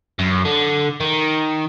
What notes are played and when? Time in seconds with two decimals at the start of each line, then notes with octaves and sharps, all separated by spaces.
0.19 F#2
0.45 D3
1.00 D#3